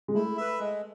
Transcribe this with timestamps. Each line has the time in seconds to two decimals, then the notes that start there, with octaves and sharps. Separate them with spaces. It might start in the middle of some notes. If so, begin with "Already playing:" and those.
0.08 G#3
0.15 A3 E4
0.37 B4 E5
0.59 G#3